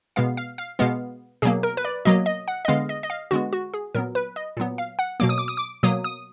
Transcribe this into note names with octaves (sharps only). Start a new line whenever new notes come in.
B2 G#3 B3 F5
F5
F5
B2 G#3 B3 F5
B2 F#3 A#3 G#4
A#4
B4
D5
B2 F#3 A#3 D#5
D#5
F#5
D#5
D3 G#3 B3 F5
D#5
D#5
F5
D3 G#3 B3 F#4
F#4
G#4
A#2 F#3 B3 A#4
B4
D#5
A#2 F#3 B3
F5
F#5
B2 F#3 A#3 D6
D#6
D6
D#6
D6
B2 F#3 A#3 D#6
D#6